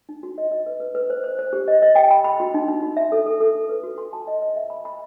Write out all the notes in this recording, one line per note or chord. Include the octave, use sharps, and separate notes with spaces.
D#4
F#4
D#5
D#5
B4
B4
B4
C5
C5
C5
G4
D#5
D#5
G5
B5
B5
F#4
D#4
D#4
F#4
E5
A4
A4
A4
A4
B4
F#4
C6
A5
D#5
D#5
E5
B5
B5